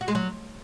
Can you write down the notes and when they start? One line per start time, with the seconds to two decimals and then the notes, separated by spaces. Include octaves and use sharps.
0.01 F#4
0.08 G#3
0.15 F#3